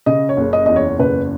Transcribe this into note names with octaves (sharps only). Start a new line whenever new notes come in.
C#3 D#5
C#5
F#1
D#5
E2 D#5
C#5
F#1 B4